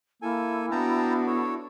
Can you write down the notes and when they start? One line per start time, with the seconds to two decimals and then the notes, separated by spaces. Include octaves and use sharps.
0.22 A#3 E4 A4 G#5
0.71 B3 D4 F#4 G5 A5 A#5
1.27 A4 C#5